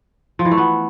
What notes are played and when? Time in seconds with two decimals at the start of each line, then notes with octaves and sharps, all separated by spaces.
0.39 F3
0.45 E3
0.51 A3
0.57 B3